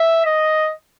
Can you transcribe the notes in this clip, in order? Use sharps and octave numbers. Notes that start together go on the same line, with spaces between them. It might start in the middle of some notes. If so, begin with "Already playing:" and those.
Already playing: E5
D#5